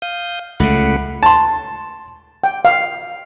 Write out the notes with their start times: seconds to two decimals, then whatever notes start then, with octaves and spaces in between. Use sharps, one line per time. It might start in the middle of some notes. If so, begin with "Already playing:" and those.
0.02 F5 D#6 G6
0.60 C#2 C#3 A3 F#5 B5
1.23 A5 C6
2.44 G5
2.65 F5